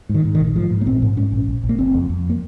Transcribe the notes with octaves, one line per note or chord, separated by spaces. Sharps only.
G#2
D#3
G#2
D#3
A#1
G#2 F3
G#2
A#3
A#1 C4
G#2
G#2 C#4
A#1
A#1
A#1
A#3
F#1 C4
F2
F2
A#3